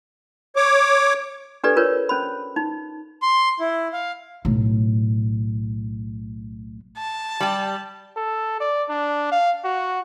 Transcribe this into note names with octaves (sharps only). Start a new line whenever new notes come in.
C#5 D6
D4 G4 A4 B4 D5
F4 A#4 B4 C#5
C#4 C5 B5
D#4
C6
E4
F5
B1 A2
A5
G3 G4
A4
D5
D4
F5
F#4